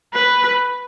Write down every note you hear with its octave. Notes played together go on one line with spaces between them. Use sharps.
B4